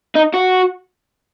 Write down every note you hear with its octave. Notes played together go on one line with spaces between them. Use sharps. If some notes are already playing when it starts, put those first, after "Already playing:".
D#4
F#4